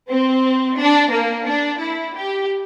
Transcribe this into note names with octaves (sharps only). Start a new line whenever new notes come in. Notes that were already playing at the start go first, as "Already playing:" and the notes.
C4
D4
A#3
D4
E4
G4